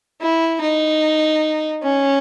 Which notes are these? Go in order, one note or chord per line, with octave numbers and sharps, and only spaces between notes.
E4
D#4
C#4